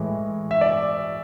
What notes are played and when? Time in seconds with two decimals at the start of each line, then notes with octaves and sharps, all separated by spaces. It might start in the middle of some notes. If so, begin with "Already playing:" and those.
Already playing: A2 E3 G#3
0.51 E5
0.61 D5